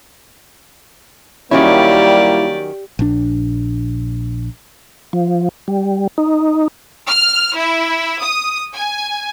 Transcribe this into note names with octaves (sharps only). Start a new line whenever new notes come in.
D#3 F#3 G3 A#3 C#4 E4 G4 D5
A#1 D4
F3
G3
D#4
F6
E4
D#6
G#5